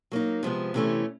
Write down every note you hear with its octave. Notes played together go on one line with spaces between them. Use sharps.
F#3 A#3 D#4
C3 F3 G#3 B3
C3 E3 A3 C#4